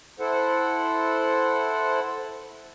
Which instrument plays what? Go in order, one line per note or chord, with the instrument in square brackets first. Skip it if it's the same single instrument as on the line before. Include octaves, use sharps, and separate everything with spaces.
[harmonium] E4 A4 C5 F#5